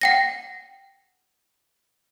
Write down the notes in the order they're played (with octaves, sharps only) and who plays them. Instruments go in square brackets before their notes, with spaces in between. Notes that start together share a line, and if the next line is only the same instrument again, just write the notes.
[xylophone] F#5 G5 A#6